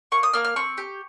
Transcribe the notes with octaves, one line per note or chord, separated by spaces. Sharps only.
A#3 C#6
D#6
A#3 F6
F6
C4 C#6
G4